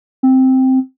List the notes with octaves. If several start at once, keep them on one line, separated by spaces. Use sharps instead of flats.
C4